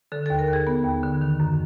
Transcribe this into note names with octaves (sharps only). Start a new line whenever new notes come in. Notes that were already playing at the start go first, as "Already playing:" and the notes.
D3 A4
D#2 A4
A#4
D#2
G#4
B3
D#2
D3
D#3
F#2